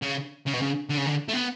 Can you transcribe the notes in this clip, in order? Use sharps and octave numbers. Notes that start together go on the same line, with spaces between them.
C#3
C#3
B2
C#3
D3
C#3
D3
A3
B3